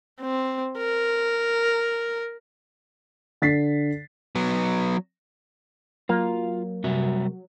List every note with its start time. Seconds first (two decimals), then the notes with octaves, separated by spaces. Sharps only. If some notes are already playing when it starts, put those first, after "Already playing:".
0.21 C4
0.78 A#4
3.42 D3 A6 B6 C7
4.35 F#3 B3
6.09 F#3 A#3 F4
6.84 C3 G3 F#4 E5